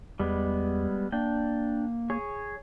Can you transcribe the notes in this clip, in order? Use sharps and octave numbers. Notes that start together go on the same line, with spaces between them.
E2 G3 G#3 B3
A#3 D4 G5
G#4 C#5